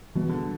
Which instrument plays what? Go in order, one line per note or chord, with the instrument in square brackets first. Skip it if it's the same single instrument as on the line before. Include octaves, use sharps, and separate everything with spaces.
[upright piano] B2 [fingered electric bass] E3 G3 B3
[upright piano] D3